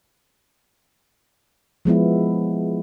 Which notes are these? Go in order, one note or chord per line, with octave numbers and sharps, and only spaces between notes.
F3 G#3 B3 E4